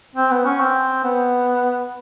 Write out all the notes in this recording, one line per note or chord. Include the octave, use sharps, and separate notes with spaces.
C4
B3
C#4
C4
B3